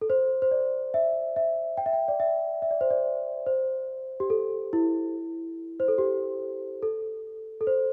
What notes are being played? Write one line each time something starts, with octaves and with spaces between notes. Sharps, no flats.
A4
C5
C5
D5
E5
E5
G5
E5
G5
D5
E5
E5
D5
C5
D5
C5
G4
A4
E4
C5
A4
G4
A4
A4
C5